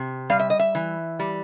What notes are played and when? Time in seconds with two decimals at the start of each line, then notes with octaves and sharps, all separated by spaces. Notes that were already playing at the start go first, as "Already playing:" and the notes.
Already playing: C3
0.30 G3 F5
0.40 E5
0.50 D#5
0.59 E5
0.75 E3
1.19 G3